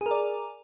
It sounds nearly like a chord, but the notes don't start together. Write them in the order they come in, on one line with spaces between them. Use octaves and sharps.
G#4 A#4 D5